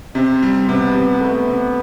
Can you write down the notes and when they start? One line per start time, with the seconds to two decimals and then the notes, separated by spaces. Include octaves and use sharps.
0.15 C3 C4
0.42 G3
0.68 C3 B3
0.95 C3
1.21 A3 B3
1.48 C3